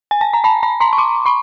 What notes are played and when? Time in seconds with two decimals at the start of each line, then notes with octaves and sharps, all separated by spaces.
0.11 G#5
0.21 A5
0.33 A#5
0.44 A5 B5
0.63 A5 B5
0.80 A#5 C6
0.93 C#6
0.98 C6 D6
1.26 B5 C#6